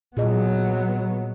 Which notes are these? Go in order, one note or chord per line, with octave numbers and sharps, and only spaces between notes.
A#2 F#3 B3 G#4 D#5